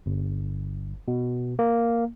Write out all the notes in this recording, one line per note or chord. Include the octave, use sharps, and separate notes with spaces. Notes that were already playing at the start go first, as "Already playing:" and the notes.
G1
B2
A#3